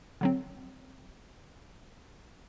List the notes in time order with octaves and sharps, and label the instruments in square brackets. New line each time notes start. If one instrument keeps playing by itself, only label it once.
[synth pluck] D3 F#3 C4